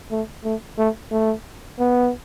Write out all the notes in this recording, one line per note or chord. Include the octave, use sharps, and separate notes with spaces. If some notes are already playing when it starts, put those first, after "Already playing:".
A3
A3
A3
A3
B3